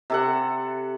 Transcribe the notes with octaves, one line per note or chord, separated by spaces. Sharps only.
C3 A4 F#5